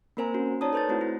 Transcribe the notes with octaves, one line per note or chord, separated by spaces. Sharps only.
A#3 C4 A#4 C5 G#5 A#5
C#4 F#4
D#4 C#5 D5 A5 A#5 D#6
A4 B4 C5 G6 A6
A3 C4 E4 F#4
E4